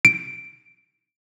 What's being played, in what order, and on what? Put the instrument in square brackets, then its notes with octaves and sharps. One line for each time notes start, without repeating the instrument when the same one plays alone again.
[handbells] D7